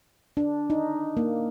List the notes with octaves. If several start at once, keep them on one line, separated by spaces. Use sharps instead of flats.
D4
D#4
A#3